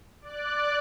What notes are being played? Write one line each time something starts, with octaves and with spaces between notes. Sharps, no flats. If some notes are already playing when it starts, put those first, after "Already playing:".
D5 F#6